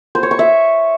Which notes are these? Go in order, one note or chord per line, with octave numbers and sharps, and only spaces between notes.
C5
C#5
C#6
E5